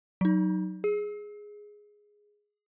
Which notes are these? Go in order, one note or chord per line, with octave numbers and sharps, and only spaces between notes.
F#3 D#4
G#4